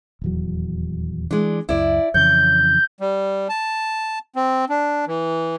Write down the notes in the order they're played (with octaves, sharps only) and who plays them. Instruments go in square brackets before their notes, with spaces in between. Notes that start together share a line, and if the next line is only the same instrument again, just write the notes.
[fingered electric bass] D#1 E2 F#3
[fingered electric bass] E3 [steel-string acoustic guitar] G#3 D4
[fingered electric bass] C#2 F#2 [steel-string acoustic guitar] E4 D5
[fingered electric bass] F2 C#3 E3 [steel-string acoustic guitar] C#5 [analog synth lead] G6
[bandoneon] G3
A5
C4
D4
E3